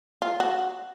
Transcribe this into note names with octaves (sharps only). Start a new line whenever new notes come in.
F4
F#4